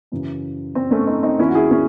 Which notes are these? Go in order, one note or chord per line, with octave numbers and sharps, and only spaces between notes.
F#2 C#3 E3
C4
A3 C#4
C4 D#4
C4 D#4
D#2 D#3 C#4 E4
F#4
E4 G#4
C#4 E4